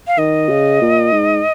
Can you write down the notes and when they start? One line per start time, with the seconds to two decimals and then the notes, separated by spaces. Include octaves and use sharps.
0.07 F5
0.18 D#3 D#5
0.49 C#3
0.81 A#2
1.12 G#2